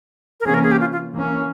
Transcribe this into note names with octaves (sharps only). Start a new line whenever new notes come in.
A#4
C3 E3 A#3 C#4 G#4
A#4
G#4
G4
F4
F4
E3 A#3 C#4